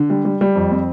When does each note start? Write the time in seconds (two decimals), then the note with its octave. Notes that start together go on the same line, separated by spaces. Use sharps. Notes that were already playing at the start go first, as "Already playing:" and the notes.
Already playing: D3
0.10 G3
0.25 G3
0.41 G3
0.56 F2
0.72 C4